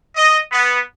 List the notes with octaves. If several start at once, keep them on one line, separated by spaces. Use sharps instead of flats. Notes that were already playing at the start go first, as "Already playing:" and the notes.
D#5
B3